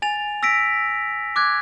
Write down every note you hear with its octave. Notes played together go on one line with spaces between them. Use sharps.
G#5 A6 F7
E6 A#6 B6 D7
D6 F#6 G#6